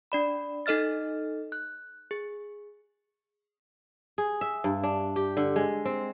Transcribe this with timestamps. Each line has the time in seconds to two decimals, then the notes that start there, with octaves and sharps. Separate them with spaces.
0.12 D4 D5 B5
0.66 D#4 A4 D#5 F6 A6
1.52 F#6
2.11 G#4
4.18 G#4
4.41 E5
4.64 G2
4.83 D4
5.16 G4
5.37 D3
5.56 G#3
5.85 C4